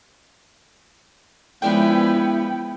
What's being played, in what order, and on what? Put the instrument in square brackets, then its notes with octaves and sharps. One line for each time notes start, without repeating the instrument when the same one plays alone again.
[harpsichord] C#3 G#3 D4 [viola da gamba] F3 B3 B4 [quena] E4 [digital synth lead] G5